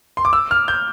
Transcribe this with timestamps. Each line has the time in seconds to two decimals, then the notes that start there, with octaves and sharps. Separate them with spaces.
0.17 C6
0.25 D6
0.33 E6
0.51 F6
0.68 G6